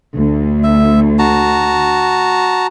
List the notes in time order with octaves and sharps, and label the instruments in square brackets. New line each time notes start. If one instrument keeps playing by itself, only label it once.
[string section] D2
[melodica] E5
F#4 A5 A#5